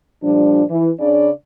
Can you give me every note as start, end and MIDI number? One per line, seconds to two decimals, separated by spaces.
0.23 0.63 46
0.23 0.63 53
0.23 0.63 55
0.23 0.63 62
0.70 0.91 52
1.00 1.30 49
1.00 1.30 62
1.00 1.30 74